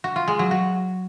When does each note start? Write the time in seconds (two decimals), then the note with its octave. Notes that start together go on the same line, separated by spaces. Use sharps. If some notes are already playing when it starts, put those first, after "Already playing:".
0.04 F#4
0.16 F4
0.28 G#3
0.39 F#3
0.51 F#4